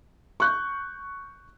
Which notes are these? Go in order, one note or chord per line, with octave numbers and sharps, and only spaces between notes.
C#6 F#6 G6